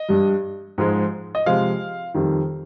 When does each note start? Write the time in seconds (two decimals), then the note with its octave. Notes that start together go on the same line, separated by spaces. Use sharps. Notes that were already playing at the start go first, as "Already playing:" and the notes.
Already playing: D#5
0.09 G2 G3
0.78 G#2 F3 G#3
1.35 D#5
1.46 C3 F3 G#3 F5
2.14 F2 D#3 G3